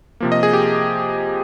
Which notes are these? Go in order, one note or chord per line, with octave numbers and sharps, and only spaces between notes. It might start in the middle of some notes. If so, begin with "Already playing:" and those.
C3 F3 A#3
D#5
G#4
G4